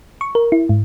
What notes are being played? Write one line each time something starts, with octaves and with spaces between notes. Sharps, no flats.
C#6
A#4
E4
G#2